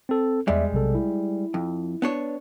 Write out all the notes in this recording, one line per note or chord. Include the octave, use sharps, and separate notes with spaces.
C4 A4
E2 G3 G#3 D5 E5
B1 C3 A4
E4
F2
B3 D4 C#5